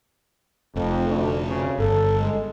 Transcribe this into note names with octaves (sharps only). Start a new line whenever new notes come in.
F1 F2
D2
D2 C#3
G1 A4
G#3